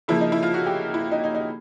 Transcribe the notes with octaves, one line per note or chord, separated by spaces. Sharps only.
C#3 F3 A#3 E4
D#4
E4
F4
F#4
G4
E4
D#4
D#4
D#4